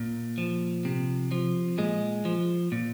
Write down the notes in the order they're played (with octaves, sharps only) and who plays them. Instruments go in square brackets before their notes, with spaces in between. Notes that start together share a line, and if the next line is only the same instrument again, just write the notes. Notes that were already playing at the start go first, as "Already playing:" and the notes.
Already playing: [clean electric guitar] A#2
F3
C3
F3
A#2 G#3
F3
A#2